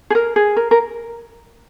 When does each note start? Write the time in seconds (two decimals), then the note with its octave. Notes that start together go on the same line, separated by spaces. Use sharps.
0.10 G#4
0.15 A#4
0.36 G#4
0.56 A#4
0.71 A#4